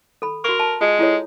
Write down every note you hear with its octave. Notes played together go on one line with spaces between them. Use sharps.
A4 B5
F#4 A#4 C#6
A5
G#3 F4
E4 A4 C#5